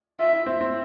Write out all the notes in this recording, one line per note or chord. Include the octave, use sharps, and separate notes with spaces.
F4 E5
E4
C4
C4